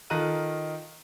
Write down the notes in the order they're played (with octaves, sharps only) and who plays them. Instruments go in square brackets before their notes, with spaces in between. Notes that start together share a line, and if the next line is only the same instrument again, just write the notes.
[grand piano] D#3 F4 A4 A#5 F#6 D#7